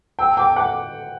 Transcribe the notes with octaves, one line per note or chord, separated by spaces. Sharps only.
G5 E6
G5 D6
F#5 D6